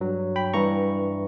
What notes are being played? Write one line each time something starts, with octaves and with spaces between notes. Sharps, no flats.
G2 F#3
G5 B5
G2 E3 G3 A#5 C#6